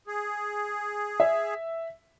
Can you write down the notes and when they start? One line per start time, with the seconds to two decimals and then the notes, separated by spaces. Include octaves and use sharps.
0.07 G#4
1.20 E5